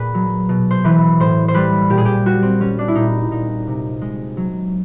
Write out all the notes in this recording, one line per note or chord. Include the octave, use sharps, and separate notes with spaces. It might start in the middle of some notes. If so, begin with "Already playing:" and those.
Already playing: A#2 G#4 B4
F#3
B2
C5
E3 B4
A2 C5
C5
G3 B4
A#2 G4
G#4
G4
G3 F#4
C4
G3 C#4
D4
E4
A#2 D#4
A#2 D#4
C3
G#3
F#3